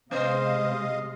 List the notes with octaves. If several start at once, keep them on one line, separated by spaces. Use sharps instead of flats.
C3 G#3 B3 C5 D#5 F5